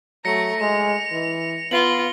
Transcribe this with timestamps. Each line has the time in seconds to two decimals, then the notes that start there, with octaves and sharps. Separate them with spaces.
0.25 F#3 A3 A#5 A#6 C#7
0.61 G#3 F7
1.11 E3
1.71 B3 F4 F#7 G7